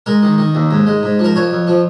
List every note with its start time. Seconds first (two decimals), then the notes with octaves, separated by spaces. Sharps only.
0.06 G#3 A#4
0.23 D#3
0.38 D#3
0.55 D#2
0.71 G#2
0.86 G#3
1.03 G#2
1.19 F3 A#4
1.35 F2 C#5
1.51 F2
1.67 F3